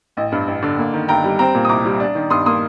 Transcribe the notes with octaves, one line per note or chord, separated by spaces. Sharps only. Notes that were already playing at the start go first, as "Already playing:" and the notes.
A1 D#5
G2
A1
D3
A#3
D#3
G2 G5 A#5
G3
C4 G5 A#5
A#2
D#6
C2 A#5 D6
G3
D4
D#3
G2 C6 D#6
A#3 C6 D#6